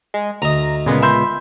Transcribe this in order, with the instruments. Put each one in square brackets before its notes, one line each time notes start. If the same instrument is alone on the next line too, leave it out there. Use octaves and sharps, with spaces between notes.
[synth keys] G#3
[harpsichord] D2 D#5 [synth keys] A#5
[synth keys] A#2 G#3 B3 [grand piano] C#3
[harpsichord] E5 [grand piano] B5 C6 G6